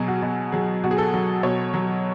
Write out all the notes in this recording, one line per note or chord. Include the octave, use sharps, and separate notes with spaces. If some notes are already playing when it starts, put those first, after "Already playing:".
Already playing: B2 F#3 G#4
F#4
B2
F#3 G#4
B2 F#4
G#4
A4
F#3
B2 C#5
F#3